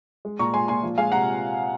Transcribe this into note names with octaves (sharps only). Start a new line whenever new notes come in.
G#3
A#2 A#5 C#6
G#3 G#5 C6
A#2 G#5 C6
F3
G#3 F5 G#5
C3 F#5 A#5